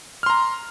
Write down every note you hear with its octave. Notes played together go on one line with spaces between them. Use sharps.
A#5 C6 F6